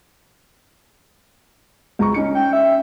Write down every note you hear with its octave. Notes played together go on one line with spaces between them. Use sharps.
C#2 A#5 C#6
C#4 D#4 C#7
G5
E5